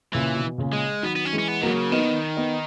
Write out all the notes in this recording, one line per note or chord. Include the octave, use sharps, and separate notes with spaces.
A#2 C#3 E3
B2
A#2 C#3
G#3
D#3 F#3 B3
B3
C#4
E3 G#3
C#4
B3
D#3 F#3 A#3
C#3
D#3 B3 D#4
B3 D#4